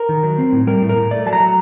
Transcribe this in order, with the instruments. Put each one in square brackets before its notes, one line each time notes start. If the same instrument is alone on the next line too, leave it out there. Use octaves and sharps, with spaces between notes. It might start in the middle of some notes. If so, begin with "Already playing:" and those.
Already playing: [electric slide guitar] A#4
D#3
F#3
C4
A2
G3 A#4
A2
A#4
A2
A3 D5
F#3 A5
A#5
F#3